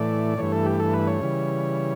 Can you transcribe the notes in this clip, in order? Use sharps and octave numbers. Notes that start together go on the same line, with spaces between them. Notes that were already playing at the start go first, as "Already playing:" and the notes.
Already playing: A2 E3 A3 D5
G2 E3 A3 C#5
A4
G4
A4
B4
C#5
C#3 E3 G3